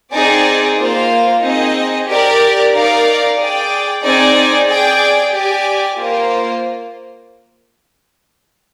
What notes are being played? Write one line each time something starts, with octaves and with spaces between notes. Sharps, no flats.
C4 D#4 G#4 D5
A#3 F4 C5 F5
C4 D#4 G#4 D#5
G4 A#4 D5
D#4 A#4 D5 F5
G#4 D5 G5
C4 D#4 G#4 D5 G#5
G#4 D5 G5
G4 D5 G#5
A#3 F4 C5